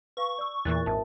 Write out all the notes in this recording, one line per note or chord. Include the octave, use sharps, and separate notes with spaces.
B4 F5 C#6
D5 E6
E2 A#2 E3 A#4 F#6 A6
G#1 A#4 E5 A5